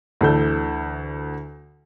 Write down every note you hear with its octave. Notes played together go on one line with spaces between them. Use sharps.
D2 E3 A4 G6